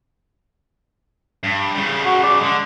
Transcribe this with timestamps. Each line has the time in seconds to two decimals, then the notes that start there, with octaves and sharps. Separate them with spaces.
1.43 G2
1.75 C#3 G3
2.05 F#4
2.23 D5
2.41 D3 G#3